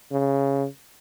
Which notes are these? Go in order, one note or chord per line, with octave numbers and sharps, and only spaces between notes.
C#3